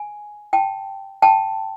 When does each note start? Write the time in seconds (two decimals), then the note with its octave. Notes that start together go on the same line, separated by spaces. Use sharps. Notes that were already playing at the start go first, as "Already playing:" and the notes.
Already playing: G#5
0.53 G5 A5
1.22 G5 A5